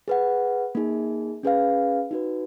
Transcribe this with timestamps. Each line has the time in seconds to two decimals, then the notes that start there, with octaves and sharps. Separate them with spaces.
0.08 G#4 B4 F#5
0.75 A#3 D#4 G#4
1.43 C#4 G#4 B4 F5
2.11 D#4 F#4 B4